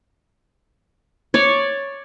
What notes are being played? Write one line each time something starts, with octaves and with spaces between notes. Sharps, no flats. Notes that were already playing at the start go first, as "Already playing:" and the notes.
C#5 D5